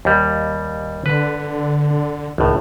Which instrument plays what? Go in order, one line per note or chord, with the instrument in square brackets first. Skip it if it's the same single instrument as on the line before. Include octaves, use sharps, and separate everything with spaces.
[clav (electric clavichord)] D#2 G3
[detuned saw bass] D3 [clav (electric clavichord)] B4
[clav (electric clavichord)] G#1 A2 [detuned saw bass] C#2